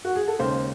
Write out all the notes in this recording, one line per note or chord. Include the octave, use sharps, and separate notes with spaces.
F#4
G#4
A4
D#2 C#3 G#3 C5